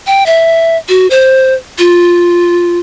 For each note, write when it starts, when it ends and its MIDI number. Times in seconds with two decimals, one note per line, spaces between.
0.07 0.24 79
0.26 0.77 76
0.89 1.07 66
1.11 1.54 72
1.78 2.80 65